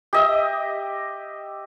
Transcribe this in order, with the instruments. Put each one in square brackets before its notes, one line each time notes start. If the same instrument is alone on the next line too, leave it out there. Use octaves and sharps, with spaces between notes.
[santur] G4 D#5 E5